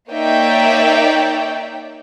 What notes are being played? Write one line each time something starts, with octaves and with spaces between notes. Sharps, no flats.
A#3 D#4 C#5 D5 E5 G5